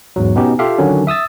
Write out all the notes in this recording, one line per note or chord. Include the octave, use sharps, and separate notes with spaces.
E2 G#2 F#3
B2 B3 C#4 D#4 G4
F4 G4 A4 E5 F5
D3 D#3 F#3 C#4
E5 D#6 E6 A6